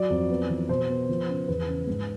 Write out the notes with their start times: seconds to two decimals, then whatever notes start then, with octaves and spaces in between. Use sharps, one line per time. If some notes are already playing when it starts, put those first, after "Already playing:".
Already playing: F#3 D5
0.10 F2
0.30 B3
0.49 E3
0.69 B2 C5
0.89 B3
1.09 F3
1.29 C#3
1.48 E2 B4
1.68 C#3
1.87 G#2